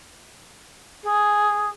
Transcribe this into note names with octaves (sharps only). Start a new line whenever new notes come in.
G#4